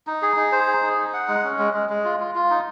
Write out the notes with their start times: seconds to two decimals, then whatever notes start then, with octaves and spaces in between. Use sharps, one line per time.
0.07 D#4
0.22 G#4
0.37 D#4
0.52 C5
0.67 G#4
0.82 D#4
0.98 D#4
1.14 F#5
1.28 G#3
1.44 C#4
1.59 G#3
1.73 G#3
1.89 G#3
2.04 F4
2.20 F4
2.35 F4
2.50 D#4